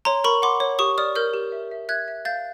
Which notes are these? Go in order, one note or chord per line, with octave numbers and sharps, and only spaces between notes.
C#5 A#5 C6
A#4 B5 C#6
F#5 C6 D6
C#5
G4 C#6 D#6
D5 D#6 F6
A#4 F6 G6
G4
E5
E5
E5 F#6 G#6
E5
F5 G6 A6